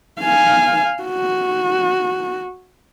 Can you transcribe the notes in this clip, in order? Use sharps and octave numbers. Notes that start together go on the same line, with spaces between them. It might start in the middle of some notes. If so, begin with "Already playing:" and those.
F5 G#5
F#4